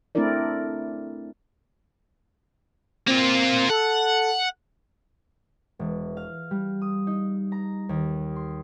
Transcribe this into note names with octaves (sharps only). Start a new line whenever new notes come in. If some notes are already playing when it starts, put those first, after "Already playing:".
A3 C4 D4 E4 A#4 D5
A#3 C4 F4
A4 F#5
E1
F5
G3
D#6
D#4
A#5
D#2
C6